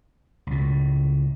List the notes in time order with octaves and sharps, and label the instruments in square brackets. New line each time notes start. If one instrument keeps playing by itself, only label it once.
[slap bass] C#2 A2